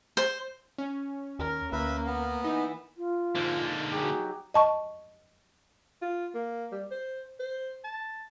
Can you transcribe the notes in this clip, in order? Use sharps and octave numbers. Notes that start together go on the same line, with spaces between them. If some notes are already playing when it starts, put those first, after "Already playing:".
C5
C#4
D#2 A#4
D2 A#3 B4 E5
B3
E3 D#4
F4
G#2 D3 A#3
F#3 G4 G#4
D#5 A5 C#6
F4
A#3
G3
C5
C5
A5